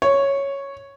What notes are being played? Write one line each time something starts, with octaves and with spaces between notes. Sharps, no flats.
C#5